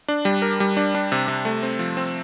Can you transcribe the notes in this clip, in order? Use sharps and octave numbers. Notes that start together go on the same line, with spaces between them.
D4
G3
A#4
G3
D4
D4
C3
C3
A3
C4
F3
C4